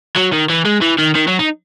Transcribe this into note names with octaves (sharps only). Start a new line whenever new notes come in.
F#3
D#3
E3
G#3
E3
D#3
D#3
F#3
D#4